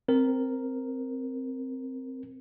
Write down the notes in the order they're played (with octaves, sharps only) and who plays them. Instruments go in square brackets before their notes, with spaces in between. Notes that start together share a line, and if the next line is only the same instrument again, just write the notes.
[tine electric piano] C4 A#4